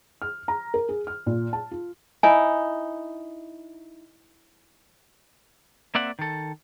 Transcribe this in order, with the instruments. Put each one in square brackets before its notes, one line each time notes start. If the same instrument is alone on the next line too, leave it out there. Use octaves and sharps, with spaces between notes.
[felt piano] F6
A#5
A#4
G#4
F6
A#2
A5
F4
[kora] D#4 E4 [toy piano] G#5
[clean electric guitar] A#3 C4 D5 E5 F#5
D#3 A4